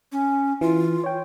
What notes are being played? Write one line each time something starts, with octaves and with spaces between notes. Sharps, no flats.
C#4
E3 F4
C#5 G5